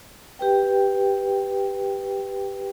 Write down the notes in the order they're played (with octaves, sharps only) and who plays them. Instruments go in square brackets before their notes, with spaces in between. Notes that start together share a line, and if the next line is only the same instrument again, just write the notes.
[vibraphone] G4 B4 G5